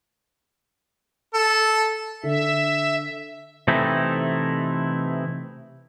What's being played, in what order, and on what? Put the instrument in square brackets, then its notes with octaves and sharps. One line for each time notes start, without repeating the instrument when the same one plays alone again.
[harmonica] A4
[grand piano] D3 [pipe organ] E5
[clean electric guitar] C3 E3 A3 C4 D#4 E4